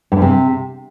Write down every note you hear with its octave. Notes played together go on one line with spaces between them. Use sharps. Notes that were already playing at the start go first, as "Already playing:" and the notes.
G2
F#2
C3